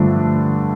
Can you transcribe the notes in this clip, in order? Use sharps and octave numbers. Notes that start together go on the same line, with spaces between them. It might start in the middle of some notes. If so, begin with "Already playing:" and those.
Already playing: G2 D3 F3 A3 D4